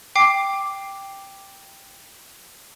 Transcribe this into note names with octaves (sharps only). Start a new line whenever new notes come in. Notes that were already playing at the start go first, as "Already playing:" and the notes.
G5 D6 C7